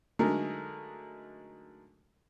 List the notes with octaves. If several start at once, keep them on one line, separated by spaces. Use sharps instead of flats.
D3 F#3 G#3 A3 D#4 A#4